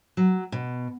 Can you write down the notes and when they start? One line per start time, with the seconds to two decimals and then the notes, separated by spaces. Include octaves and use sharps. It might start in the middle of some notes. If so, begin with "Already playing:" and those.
0.17 F#3
0.52 B2